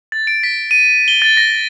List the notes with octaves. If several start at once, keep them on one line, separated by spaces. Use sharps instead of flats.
A6
D7
B6
D#7
G7
A6
A#6